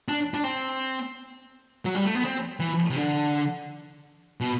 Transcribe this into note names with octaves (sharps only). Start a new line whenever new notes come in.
D4
D4
C4
F#3
G3
A3
B3
C4
E3
C3
D3
B2